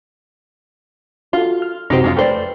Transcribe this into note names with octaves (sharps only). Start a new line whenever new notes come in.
F4 F#4 A4
F6
F#2 C3 D#4 F#4 G4 C5
F2 G#3 D#4 F4
A3 B4 C5 D5 G5